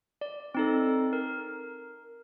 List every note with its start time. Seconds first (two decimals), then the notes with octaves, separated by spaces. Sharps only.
0.21 D5
0.55 C4 D#4 A4
1.13 A#4